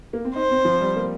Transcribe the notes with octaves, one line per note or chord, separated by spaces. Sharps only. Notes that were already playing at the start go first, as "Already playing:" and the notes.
A#3
C4
D#4 C5
C4
F3
G3
A#3